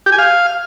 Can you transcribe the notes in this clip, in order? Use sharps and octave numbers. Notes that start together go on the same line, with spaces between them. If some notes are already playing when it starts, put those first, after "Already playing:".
G4
G#5
F5